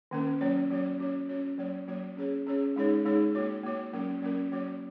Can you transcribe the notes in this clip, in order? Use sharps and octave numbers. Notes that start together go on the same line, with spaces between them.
D#3 A#3 C#4 A#4
F#3 A#3 C#4 F#4 C#5
F#3 A#3 C#4 F#4 C#5
C#4 F#4 C#5
C#4 F#4 C#5
F#3 A#3 F#4 C#5
F#3 A#3 F#4 C#5
C#4 G#4 C#5
C#4 G#4 C#5
G#3 D#4 G#4 C#5
G#3 D#4 G#4 C#5
A#3 F#4 C#5
A#3 F#4 C#5
F#3 A#3 C#4 F#4 A#4
F#3 A#3 C#4 F#4 A#4
F#3 A#3 F#4 C#5